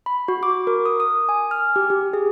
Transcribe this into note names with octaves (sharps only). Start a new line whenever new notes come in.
B5
F#4
D6
A#4
D#6
D#6
G#5
F6
G4
G4
G#4